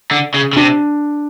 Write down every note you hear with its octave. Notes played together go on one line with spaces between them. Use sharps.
D3
C#3
C#3
C3 D4